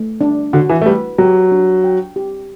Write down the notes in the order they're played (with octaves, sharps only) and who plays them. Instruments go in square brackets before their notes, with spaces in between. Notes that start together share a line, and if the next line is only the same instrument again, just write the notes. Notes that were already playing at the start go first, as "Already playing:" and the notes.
Already playing: [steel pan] A3
D4
[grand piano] D3 [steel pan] F#4
[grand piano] E3
A3
[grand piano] G3 [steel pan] B4
[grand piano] F#3 [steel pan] G4
[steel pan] D4
G5
G4